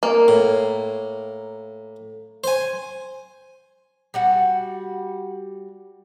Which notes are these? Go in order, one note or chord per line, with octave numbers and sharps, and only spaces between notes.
A#3
A2
C5 G#5
G3 F#4 F#5